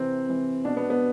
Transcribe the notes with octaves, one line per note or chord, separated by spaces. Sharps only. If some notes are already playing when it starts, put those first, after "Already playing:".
Already playing: C3 E3 C4
C3 E3
B2 D4
B3
B3